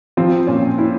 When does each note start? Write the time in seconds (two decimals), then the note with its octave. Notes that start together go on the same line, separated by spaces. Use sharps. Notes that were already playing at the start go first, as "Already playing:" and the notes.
0.17 F3 C4
0.47 A#2 C#4
0.78 E4